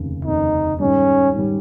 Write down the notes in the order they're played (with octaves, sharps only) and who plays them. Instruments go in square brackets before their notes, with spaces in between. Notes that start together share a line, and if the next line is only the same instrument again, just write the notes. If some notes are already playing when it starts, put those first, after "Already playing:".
Already playing: [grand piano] F1 D#2 C#3
[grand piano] F1 D#2 C#3 [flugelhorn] D#4
[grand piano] G#2 D#3 G3 [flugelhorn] C#4
[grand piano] G#2 D#3 G3